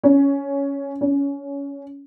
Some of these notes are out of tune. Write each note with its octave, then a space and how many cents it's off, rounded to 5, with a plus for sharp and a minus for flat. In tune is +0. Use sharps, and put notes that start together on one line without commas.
C#4 +10
C#4 +20